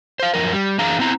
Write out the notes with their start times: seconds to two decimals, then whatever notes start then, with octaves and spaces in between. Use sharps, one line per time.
0.20 C5 F5
0.34 F#2 F3 A#4
0.53 G3
0.78 F#2 E3 D4 G#4 F5 A#5
0.99 B3 C4 E4 A#5